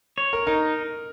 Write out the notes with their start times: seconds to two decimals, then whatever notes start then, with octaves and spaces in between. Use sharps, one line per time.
0.18 C#5
0.33 A#4
0.47 D#4 A#4